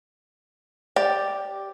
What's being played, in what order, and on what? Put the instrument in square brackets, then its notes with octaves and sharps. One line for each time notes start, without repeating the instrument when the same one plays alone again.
[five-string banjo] G4 D5